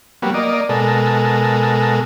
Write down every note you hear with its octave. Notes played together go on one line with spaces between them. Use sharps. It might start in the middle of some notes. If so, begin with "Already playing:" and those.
F#3 G3 A#3 B3
A#3 D5 D#5
B2 G#3 A4 A#4